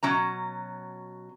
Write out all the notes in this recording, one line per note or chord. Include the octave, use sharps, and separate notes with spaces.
B2 F#3 C#4 A#5